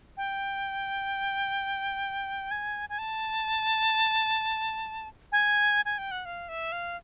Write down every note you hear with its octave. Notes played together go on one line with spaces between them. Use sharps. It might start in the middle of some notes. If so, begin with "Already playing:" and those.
G5
G#5
G#5
A5
G#5
G#5
G5
F#5
F5
E5
F5